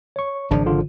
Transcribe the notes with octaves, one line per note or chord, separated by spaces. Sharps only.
C#5 C#6
G#1 C#3 F3 D4
D3 F4